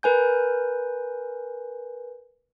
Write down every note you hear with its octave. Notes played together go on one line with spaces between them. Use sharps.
A#4 B4 G#5 G6